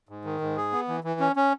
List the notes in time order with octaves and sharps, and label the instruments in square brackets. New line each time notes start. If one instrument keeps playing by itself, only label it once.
[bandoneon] G#2
D#3
G#2
G#4
B3
E3
E3
C#4
C#4